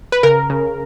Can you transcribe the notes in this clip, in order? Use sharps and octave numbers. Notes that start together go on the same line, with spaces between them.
B4
C#3 A#4
C#3